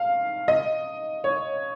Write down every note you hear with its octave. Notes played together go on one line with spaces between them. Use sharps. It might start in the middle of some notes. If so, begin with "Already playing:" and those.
Already playing: F5
D#5
C#5